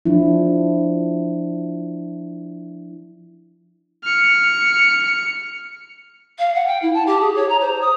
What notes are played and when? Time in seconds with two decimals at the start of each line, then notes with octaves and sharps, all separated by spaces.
0.06 F3 D4 E4
4.04 F6 C#7
6.39 F5
6.54 F#5
6.67 G5
6.82 E4
6.94 A5
7.06 G4
7.21 G#4
7.35 C#5
7.49 A#5
7.61 C5
7.81 D#6